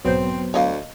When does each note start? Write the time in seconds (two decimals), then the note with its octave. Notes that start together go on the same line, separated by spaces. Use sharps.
0.05 B1 G#2 F#3 B3 C4 C5
0.54 D2 C#5 D#5 F5